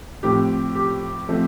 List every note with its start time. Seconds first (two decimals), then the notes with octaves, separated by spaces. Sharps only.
0.23 A2 F3 C4 G4
0.75 G4
1.29 F3 A3 C4